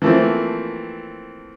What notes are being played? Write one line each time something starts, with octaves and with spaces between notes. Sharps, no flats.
E3 F3 A3 A#3 C4